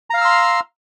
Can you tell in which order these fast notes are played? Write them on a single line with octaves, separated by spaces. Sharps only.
A#5 F5 F6 E6 C6